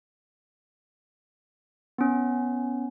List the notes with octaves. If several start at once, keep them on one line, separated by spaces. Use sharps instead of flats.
B3 C#4